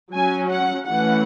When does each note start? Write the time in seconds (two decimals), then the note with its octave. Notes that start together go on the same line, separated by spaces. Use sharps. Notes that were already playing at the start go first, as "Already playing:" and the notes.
0.12 F#3 C#4 G#5
0.50 F#5
0.88 E3 A3 C#4 F#5